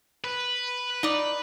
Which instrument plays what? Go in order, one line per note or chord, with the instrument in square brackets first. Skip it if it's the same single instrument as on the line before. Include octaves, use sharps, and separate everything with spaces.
[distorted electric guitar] B4
[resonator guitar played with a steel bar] D#4 D5